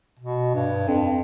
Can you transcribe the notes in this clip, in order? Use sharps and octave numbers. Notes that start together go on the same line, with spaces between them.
B2
G2
F2